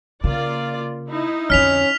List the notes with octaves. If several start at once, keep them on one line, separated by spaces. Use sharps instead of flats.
C#3 A#3 F4 D5
D#4 E4
F2 D3 C#4 F6 B6 F7